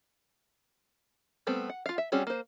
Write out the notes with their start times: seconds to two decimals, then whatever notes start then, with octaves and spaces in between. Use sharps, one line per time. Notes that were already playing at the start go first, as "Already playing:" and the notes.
1.47 G3 A3 B3 C4
1.70 F#5
1.86 F4 F5
1.98 E5
2.12 G3 C4 C#4 F#4 G#4
2.27 A#3 C5